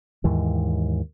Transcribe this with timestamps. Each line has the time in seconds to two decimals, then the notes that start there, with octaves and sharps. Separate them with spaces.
0.24 D#2 G#2 E3